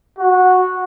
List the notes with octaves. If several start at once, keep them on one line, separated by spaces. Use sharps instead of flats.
F#4